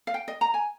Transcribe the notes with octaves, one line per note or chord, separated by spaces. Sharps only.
F5
G5
D#5
A#5
G#5